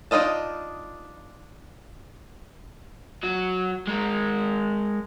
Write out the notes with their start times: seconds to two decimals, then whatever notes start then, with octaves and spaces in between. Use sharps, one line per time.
0.11 D4 D#4 F4 D#5 A5
3.23 F#3 F#4
3.87 G#3 A#4